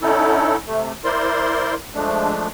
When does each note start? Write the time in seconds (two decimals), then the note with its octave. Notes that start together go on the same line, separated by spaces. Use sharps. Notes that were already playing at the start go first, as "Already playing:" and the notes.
0.01 D3 C#4 D#4 E4 A4
0.67 C3 A3
1.04 E4 A#4 C5 D5 C6
1.94 F3 G#3 A3 D4